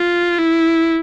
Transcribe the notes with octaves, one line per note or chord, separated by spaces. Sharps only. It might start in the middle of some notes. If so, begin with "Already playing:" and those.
Already playing: F4
E4